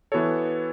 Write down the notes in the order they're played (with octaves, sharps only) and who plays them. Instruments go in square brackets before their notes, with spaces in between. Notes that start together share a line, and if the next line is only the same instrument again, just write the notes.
[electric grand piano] E3 B3 F#4 A4 C#5